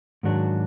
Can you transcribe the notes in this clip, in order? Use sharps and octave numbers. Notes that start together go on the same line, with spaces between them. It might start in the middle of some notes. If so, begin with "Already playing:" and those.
G#2 D#3 F#3 D4 F#4